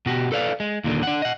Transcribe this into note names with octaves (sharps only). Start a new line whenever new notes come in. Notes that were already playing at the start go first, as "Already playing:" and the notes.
B2 F#4 G4
A4 B4 D5 F5
G#3
D#2 A#2 D3
D4 F#5
D#5 F#5